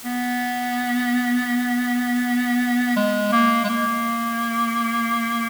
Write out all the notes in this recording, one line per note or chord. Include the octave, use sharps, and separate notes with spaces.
B3
G#3
A#3
G#3
A#3